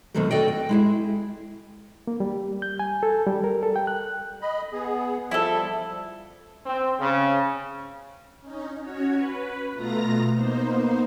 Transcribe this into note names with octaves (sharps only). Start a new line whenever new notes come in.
F2 B2 D3 D#3 F#3 A3
F#4 A4 D5 D#5 G5
G5
G#3 E4 G#4
A#3
G3
G6
G#5
A4
G3
A#4
A4
G5
F#6
D#5 B5
B3 G#4
F3 G3 E4 A4
C4
C#3
C#4 D#4
C#4 F#4 C#5
B4
B2 A3 B3 F4 A#5 A#6
A#3 B3 D#4 C5